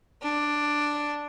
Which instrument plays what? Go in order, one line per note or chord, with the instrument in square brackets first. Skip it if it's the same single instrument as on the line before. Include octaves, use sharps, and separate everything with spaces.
[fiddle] D4